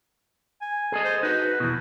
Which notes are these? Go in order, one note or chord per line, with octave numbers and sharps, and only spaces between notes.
G#5
G#4 A4 D#5
C5
D#4 F#4 B4
E2 B2 E4